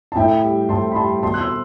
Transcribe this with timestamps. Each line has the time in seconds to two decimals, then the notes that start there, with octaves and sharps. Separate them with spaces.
0.12 A5
0.16 A2 E5 G5
0.43 G3
0.69 A2 A5 C6
0.92 B5
0.95 G3 A5 C6
1.23 B2 A5 C6
1.34 F#6
1.40 C6 E6